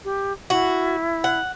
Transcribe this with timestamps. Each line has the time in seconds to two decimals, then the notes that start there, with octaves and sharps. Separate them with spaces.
0.05 G4
0.50 E4 F#4
1.24 F#5